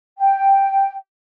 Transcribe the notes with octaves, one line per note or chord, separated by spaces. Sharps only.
G5